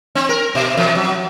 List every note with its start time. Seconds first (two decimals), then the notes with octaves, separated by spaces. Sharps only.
0.15 C4
0.29 A#4
0.55 B2
0.77 F2
0.95 F#3